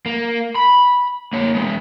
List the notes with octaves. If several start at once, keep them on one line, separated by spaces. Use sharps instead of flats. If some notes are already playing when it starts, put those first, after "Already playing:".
A#3
B5
A#3 C#5
G#3 B3